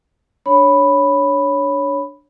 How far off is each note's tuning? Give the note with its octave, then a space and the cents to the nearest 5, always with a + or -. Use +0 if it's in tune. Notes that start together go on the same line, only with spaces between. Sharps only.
D4 +0 C#5 +0 B5 +0